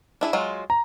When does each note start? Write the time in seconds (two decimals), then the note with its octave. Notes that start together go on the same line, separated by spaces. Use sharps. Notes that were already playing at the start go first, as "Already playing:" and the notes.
0.21 D4 E4 G#4
0.33 F#3 G#3 F4
0.70 A#5